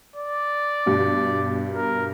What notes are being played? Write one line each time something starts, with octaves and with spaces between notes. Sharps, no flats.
D5
G2 B2
A#4